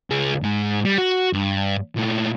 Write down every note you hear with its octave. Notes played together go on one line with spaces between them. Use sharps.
C#2 G#4
G#2 G#3
G3
F#4
G2
A#2 A3